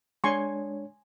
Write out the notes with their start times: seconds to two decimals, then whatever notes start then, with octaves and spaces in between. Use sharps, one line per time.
0.24 G#3 D4 C#5 G#5 C6 C#6